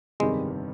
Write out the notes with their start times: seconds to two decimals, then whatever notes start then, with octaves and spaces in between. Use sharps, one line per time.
0.20 G1 F2 C3 D#3 G3 G#3